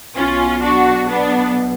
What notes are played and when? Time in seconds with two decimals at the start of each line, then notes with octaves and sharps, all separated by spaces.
0.16 B1 B2 C#4 F4
0.62 D4 F#4
1.08 B3 D4